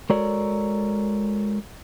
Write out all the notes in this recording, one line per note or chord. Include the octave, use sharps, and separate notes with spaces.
G#3 F#4 A4 A#4 C#5 D5